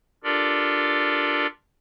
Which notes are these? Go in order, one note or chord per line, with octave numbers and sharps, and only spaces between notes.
D4 F4 G4 A4 A#4 D5